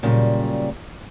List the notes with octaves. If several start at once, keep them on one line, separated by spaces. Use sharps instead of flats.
A#2 C#3 F#3 G3